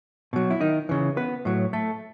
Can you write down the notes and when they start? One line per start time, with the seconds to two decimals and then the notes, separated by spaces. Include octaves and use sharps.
0.33 B2 F#3
0.50 E4
0.61 D#3 D#4
0.89 C#3 E3
1.17 B3 B4
1.45 A2 F#3
1.73 A3 A4